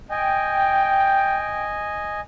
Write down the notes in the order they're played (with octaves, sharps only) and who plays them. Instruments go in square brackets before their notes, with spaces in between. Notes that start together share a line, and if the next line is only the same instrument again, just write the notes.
[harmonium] D#5 G#5 [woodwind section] G5